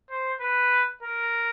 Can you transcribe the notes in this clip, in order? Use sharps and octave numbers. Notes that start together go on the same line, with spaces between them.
C5
B4
A#4